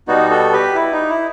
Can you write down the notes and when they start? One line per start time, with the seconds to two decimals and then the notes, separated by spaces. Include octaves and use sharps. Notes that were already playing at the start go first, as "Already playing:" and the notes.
0.08 B2 G3 B3 D#4 F#4
0.30 F#4 A4
0.53 G4 B4
0.75 E4
0.92 D#4
1.09 E4